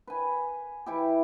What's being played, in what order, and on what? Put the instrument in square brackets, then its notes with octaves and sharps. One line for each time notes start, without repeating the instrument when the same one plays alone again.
[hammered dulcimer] B4 G#5
E3 E4 G4